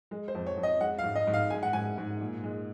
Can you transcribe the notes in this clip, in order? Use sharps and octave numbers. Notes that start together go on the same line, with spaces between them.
G#3
C5
F2
C#5
F2
D#5
G#3 F#5
F5
G#2
D#5
G#2
F5
G#3 G#5
F#5
G#2 G#5
G#2
A#2
G#3